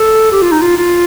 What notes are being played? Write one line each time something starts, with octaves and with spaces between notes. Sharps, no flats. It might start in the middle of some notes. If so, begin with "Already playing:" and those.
Already playing: A4
G4
F4
D#4
F4
F4